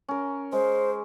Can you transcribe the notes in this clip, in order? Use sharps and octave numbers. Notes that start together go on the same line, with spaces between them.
C#4 A#4
G#3 C5